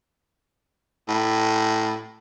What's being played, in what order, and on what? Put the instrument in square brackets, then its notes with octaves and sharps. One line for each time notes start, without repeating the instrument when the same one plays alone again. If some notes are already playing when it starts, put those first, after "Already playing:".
[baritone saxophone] A2